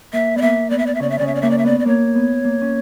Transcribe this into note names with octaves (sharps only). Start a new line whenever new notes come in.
A#3 E5
B3 D5
A#3 E5
B3 D5
E5
D5
E5
C#3 C#4 D5
E5
C#3 C#4 D5
E5
D5
A#3 E5
D5
E5
B3 D5
D5
A#3 C#5
B3
A#3
C#4